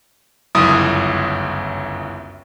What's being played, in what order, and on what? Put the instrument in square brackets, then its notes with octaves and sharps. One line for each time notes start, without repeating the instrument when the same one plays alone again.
[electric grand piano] G1 C#2 F#2 E4 D#6